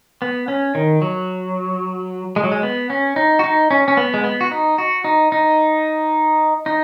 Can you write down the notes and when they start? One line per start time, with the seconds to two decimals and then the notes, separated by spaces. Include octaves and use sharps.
0.22 B3
0.48 C#4
0.75 D#3
1.02 F#3
2.36 G#3
2.44 F#3
2.52 G#3
2.63 B3
2.90 C#4
3.16 D#4
3.39 F#4
3.44 D#4
3.71 C#4
3.88 C#4
3.97 B3
4.14 G#3
4.24 B3
4.41 F#4
4.51 D#4
4.78 F#4
5.04 D#4
5.32 D#4
6.66 D#4